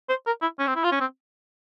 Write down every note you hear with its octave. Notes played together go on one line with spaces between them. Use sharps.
C5
A#4
E4
C#4
C4
E4
F4
C#4
C4